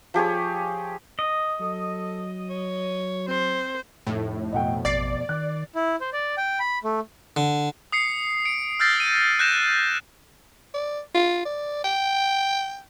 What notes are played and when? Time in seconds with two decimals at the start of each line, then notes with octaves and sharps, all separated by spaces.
0.14 F3 G4 G#4 C#5
1.19 D#5
1.60 F#3 A4
2.50 C#5
3.28 C4 C5
4.07 F1 A2
4.52 F2 B2 A3 D#5 F#5 G5
4.85 A1 D5 A6 C7
5.29 D#3 F#6
5.75 E4
6.01 C5
6.13 D5
6.37 G5
6.60 B5
6.84 A3
7.36 D3
7.92 D#6 C7 C#7
8.45 C#7 D7
8.79 E6 F6 G6 A6 A#6 C7
9.00 D#7
9.39 F#6 G6 A#6 E7
10.74 D5
11.15 F4
11.45 D5
11.84 G5